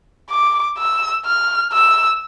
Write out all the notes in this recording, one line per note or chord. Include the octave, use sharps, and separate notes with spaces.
D6
E6
F6
E6